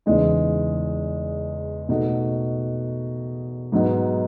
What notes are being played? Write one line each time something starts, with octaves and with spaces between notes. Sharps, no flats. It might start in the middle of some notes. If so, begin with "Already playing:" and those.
E2 C#3 E3 G#3 D#4
B2 A3 D#4 F#4
G#2 F#3 B3 D#4